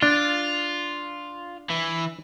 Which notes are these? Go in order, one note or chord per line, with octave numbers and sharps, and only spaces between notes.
D4 F4
E3